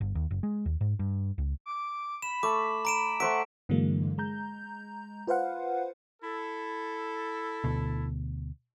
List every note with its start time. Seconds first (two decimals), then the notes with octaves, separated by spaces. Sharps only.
0.01 G1
0.15 D#2
0.31 F#1
0.43 G#3
0.66 D#2
0.81 G#2
0.99 G2
1.38 C#2
1.66 D6
2.22 B5 E7
2.43 A3 D6
2.85 A#5 D7 E7
3.20 A3 C5 E5 F#5 B6 D7
3.69 G2 D3 E3 F#3 G#3 A#3
4.18 G#3 A#5 G6
5.27 F4 B4 C5 F5 F#5
6.22 E4 A4
7.64 D2 B2